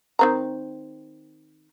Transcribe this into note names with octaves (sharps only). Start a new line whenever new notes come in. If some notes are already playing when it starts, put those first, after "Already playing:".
D#3 C4 A#5